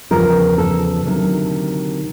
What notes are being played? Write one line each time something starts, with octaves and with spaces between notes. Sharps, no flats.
E2 C#3 F3 A#4
A4
D2 C3 D#3 F#3